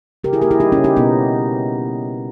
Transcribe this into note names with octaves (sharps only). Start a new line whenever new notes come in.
C#3 G4 A#4
E4 G#4
A#3 G4 A#4
E4 G#4
G3 D#4 G4
C#4 E4
C#3
D#4 G4
B2 B3 D#4